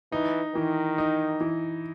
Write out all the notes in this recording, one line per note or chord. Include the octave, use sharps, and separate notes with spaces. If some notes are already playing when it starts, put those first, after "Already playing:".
E3 D#4
D#3 E3
D#4
E3